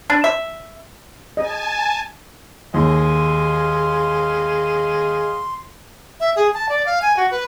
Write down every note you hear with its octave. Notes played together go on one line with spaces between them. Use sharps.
D4
E5
D#5 G#5 A5
D#2 G#4 D#5 F5 C6
E5
G#4
A5
D5
F5
G#5
F#4
B4